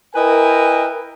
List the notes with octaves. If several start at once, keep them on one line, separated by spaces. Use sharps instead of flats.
E4 A#4 B4 D#5 G5 G#5